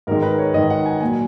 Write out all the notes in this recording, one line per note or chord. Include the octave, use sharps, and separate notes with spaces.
G#2 D#3 G#3 A#4
B4
C#5
G#2 D#3 G#3 D#5
F#5
G#5
A#2 F#3 G#5